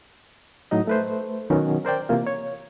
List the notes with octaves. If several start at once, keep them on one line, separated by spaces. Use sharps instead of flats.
A2 F#3 D#4 D#5
A3 B4 C5
B2 D#3 F#3 B3 C#4 F#4
A#4 C5 D5 G5
C3 E3 A#3 F4
C#5